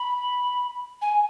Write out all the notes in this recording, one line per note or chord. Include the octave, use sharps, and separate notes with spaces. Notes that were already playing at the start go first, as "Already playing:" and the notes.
Already playing: B5
G#5